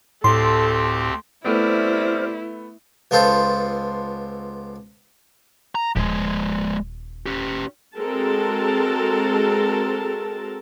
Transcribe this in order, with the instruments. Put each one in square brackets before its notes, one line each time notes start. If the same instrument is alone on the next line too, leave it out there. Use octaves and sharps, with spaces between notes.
[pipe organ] D2 C4 G4 [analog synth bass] A2 [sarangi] A4 [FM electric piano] C6
[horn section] C3 G3 C4 [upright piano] A3 B3 [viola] E4 [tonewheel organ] C5 F6
[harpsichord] C#2 B3 F4 A4 C5
[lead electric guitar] A#5
[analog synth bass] D#1 [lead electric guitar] F3 G#3
[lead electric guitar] C#4 G4
[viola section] G#3 C4 F#4 A4 A#4 A5